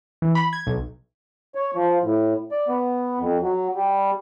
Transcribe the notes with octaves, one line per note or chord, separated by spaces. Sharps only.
E3
B5
G#6
B1
C#5
F3
A2
D5
B3
F2
F#3
G3